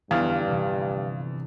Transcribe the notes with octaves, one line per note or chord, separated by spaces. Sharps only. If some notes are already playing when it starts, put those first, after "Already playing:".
F1 E2 G2 D3 F5 F6
G1 C3 E3